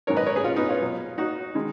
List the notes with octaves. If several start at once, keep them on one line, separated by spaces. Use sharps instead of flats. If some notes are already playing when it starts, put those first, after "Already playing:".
G#2 D#3 F#3 A#4 C#5
B4 D#5
A#4 C#5
G#4 B4
C#4 F4
B3 D#4
C#4 F4
B2 F#3
D#4 F#4
D#3 G#3